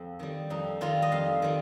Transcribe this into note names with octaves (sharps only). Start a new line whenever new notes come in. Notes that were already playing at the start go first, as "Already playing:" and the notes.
Already playing: F2 C4
D#3 G3
F2 D#4
D#3 G3 F4
D#5
F2 F5
D#3 G3